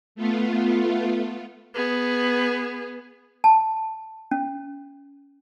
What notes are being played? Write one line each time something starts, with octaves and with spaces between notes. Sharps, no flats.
A3 B3 F4
B3 G#4
A5
C#4